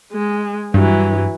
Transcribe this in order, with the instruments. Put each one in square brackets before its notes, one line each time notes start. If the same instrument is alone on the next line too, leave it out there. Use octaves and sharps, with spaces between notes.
[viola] G#3
[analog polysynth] G2 [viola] E3 F#3